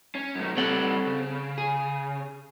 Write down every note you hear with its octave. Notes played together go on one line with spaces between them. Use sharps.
C#4
F#2 A3
G3 C4 A4 C#5 F#5
C#3
G#4